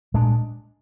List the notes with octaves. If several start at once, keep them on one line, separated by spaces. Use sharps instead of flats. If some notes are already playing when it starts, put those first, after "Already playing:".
A#2 G#3 D4